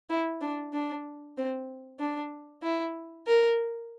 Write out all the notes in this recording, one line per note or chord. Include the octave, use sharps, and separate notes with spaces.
E4
D4
D4
C4
D4
E4
A#4